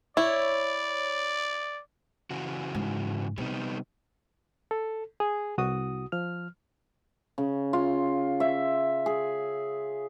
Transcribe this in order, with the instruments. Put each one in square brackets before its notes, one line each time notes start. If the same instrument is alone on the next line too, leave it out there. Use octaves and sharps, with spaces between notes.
[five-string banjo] E4 [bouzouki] C#5 [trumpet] D5
[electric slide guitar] C#3 E3 F#4
[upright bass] G#2
[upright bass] C3 [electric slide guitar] G3 B3 D#4
[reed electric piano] A4
G#4
C2 F#4 D#6
F3 F6
[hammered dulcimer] C#3
F4
E5
G#4